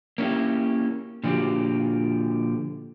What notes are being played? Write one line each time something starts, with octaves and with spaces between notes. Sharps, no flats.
A#3 C#4 E4 G4
A#2 D3 F3 B3 F#4 G4